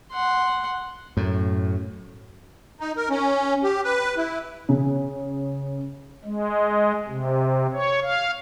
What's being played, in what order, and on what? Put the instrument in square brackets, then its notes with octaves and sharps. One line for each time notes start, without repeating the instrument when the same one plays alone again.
[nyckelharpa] F#5 C6
[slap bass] F#2 A2
[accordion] D#4
A#4
C#4
G4
B4
E4
[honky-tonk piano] C#3
[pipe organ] G#3
C3
C#5
F5